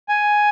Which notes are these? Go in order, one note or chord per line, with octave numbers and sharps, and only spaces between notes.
G#5